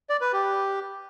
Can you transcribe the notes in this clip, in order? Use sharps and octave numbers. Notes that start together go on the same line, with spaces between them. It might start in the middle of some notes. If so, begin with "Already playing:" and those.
D5
B4
G4